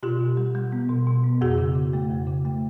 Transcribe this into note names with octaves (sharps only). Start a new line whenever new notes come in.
B2 F4 G4
B2
G3
G3
B3
B2
B2
B3
F2 F#4 G#4
C#3
C#3
A3
F2
C#3
A3